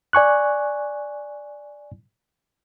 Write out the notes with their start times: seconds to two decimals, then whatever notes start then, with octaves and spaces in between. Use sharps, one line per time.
0.13 D5 G#5 C#6 F#6